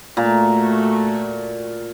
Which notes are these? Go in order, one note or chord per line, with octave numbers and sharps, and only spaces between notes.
A#2 A3 F#4